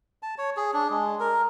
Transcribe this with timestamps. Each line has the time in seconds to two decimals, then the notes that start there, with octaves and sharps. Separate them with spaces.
0.23 A5
0.38 C#5
0.57 G#4
0.73 D4
0.90 G#3
1.20 A#4